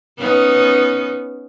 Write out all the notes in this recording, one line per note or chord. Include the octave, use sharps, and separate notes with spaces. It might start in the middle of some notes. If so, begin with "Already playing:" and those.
B3 C#4 D#4